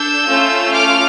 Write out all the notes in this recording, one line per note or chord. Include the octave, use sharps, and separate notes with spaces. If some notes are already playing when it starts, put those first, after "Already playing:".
Already playing: D4 A4 E6 G6
A3 C#4 F4 A4
D6 F6